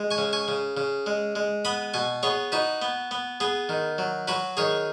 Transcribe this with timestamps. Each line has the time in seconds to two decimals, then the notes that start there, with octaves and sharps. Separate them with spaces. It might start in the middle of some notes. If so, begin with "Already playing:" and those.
Already playing: G#3
0.11 G#5 C#6
0.18 C#3
0.33 G#5 C#6
0.48 C#3
0.77 C#3
1.06 G#3
1.36 G#3
1.65 B3 B5 D#6
1.94 B2 G#5 C#6
2.23 B3 G#4 C#5
2.52 D#4 F#4 B4
2.82 B3
3.11 B3
3.40 B3 G#4
3.69 D#3
3.98 F#3
4.28 F#3 F#4 B4
4.57 D#3 G#4 C#5